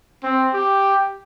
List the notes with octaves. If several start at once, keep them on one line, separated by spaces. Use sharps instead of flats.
C4
G4